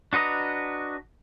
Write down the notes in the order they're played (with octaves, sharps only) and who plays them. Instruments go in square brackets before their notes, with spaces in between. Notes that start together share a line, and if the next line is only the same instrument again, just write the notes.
[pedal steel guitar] D4 F#4 B4 D#5 A#5